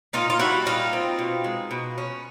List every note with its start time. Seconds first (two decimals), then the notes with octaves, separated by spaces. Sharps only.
0.13 A#2 D#4 F4
0.30 F4
0.39 G3 E4 F#4
0.66 A#2 D#4 F4
0.93 C4
1.19 B2
1.44 G#3
1.71 B2
1.98 C#4